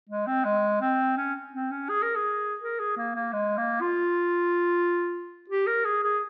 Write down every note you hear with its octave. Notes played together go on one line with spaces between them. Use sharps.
G#3
C4
G#3
C4
C#4
C4
C#4
G#4
A#4
G#4
A#4
G#4
A#3
A#3
G#3
A#3
F4
G4
A#4
G#4
G#4